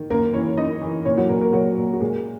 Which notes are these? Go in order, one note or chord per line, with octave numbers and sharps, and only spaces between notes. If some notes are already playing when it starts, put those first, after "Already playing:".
Already playing: D#3
F#2 A#3 A#4
E3 C#4 C#5
F#2 D#4 D#5
E3
A#2 C#4 C#5
F#3 F#4
A#2 A#3 A#4
A#3 A#4
A#2 F#3 F#4
A#2
F#4
A#2 G#3 G#4